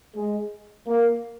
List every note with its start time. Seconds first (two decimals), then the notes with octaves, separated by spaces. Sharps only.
0.15 G#3
0.87 A#3